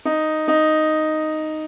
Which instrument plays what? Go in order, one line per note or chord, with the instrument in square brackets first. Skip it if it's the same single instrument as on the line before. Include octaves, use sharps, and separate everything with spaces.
[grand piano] D#4
D#4